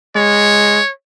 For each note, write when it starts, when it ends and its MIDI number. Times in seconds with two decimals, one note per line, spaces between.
0.16 0.80 56
0.16 0.91 73